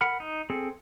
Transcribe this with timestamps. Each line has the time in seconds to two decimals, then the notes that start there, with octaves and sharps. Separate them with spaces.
0.01 A#4 F#5 B5 F6
0.20 D#4
0.50 C4 G#4 A4